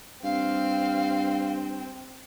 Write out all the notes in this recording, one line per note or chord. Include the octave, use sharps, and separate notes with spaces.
G2 C4 F5